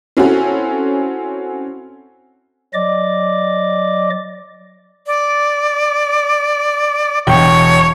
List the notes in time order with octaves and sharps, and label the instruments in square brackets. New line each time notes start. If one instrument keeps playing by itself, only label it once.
[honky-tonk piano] C4 C#4 E4 F#4 A4
[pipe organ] F#3 D5 D#5 D6
[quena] D5
[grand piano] E1 G5 [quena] C#5